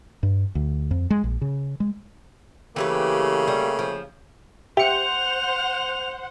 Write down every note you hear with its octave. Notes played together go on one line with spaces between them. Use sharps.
G2
D2
F2
G#3
A#1
C#3
G#3
C#3 E3 A3 A#3 G4 B4
G3
F3
G4 C5 E5 F#5 G5 C#7 F7